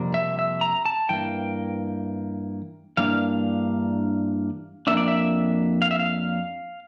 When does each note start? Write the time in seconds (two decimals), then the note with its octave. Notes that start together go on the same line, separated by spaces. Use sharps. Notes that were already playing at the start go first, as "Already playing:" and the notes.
Already playing: F2 C3 G3 A#3 D4
0.14 E5
0.39 E5
0.61 A#5
0.85 A5
1.09 G2 E3 A#3 G5
2.97 G2 E3 A#3 D4 F5
4.87 F2 E3 A#3 D4 E5
4.97 D5
5.08 E5
5.82 F5
5.91 E5
5.99 F5